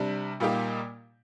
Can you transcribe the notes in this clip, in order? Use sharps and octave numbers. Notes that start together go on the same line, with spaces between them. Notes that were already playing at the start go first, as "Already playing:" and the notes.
Already playing: C3 G3 D4
A#2 G3 A#3 D#4 G4